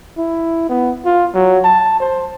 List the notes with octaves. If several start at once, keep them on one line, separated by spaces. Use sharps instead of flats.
E4
B3
F4
F#3
A5
C5